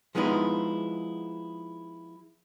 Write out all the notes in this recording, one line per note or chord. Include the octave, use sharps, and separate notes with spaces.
F3 G#3 B3 D#4 E4